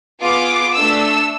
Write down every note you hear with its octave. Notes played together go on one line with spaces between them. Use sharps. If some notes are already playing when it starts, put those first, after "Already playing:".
B3 F4 G#4 D6
A3 D4 A4 E6